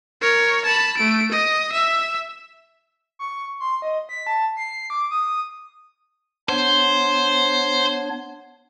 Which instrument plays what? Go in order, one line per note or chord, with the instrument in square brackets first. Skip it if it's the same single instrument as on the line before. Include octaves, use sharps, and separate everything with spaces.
[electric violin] A#4 C#5
A5 B5
A3 D7
D#5
E5
[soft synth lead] C#6
C6
D#5
B6
A5
C7
D6
D#6
[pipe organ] B3 D4 C#5 [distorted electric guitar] C5